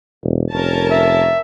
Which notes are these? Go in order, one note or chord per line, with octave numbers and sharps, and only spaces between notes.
E1
F1 C#4 A#4 A5
E5